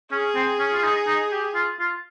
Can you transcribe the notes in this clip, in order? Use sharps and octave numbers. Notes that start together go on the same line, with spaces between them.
C#4 G#4
C4
C#4
F4
D#4
D#4
G4
F4
F4